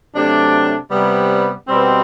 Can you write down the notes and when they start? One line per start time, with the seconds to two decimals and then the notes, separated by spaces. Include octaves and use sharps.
0.14 C3 F#3 A3 D4
0.90 C3 G3 B3
1.67 B2 G3 C4